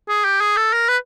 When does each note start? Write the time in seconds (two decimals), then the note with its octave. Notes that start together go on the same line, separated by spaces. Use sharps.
0.08 G#4
0.24 G4
0.40 G#4
0.56 A4
0.73 A#4
0.88 B4